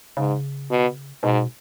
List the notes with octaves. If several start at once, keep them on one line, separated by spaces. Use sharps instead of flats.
G#2 C#3
B2
G#2 B2